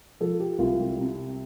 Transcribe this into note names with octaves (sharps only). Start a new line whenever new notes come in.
F3 A4
G4
C2 F4
G3
C3